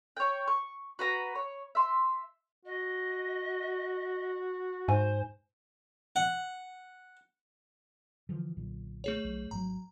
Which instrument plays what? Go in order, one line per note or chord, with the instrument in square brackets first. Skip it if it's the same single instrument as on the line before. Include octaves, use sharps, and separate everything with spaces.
[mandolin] C#5 G5
C#6
F#4 B4 A#5
C#5
E5 C6
[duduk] F#4 [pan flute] D#5
[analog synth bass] G#2 [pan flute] C5 [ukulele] G#5
[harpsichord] F#5
[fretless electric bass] D3 E3 F3
B1 A#2 D3
[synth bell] A3 G#4 C#5
[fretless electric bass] B1
[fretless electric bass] G#1 B2 F#3 [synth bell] A#5